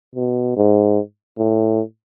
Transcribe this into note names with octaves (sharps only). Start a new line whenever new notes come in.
B2
G#2
A2